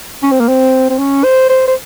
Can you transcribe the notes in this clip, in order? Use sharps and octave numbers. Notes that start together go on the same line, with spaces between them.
C#4
C4
A#3
C4
C4
C#4
C5
C5
C5